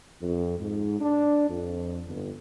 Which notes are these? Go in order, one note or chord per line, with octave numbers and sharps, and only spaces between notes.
F2
G#2
D4
F2
G1